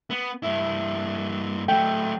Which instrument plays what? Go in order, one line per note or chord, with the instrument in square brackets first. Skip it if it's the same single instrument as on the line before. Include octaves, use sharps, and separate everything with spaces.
[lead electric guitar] B3
G2 E4
[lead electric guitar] F#3 A3 [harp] G5